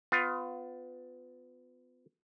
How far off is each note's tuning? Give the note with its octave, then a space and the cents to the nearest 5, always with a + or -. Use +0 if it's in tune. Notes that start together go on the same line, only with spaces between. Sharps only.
B3 +30 F4 +15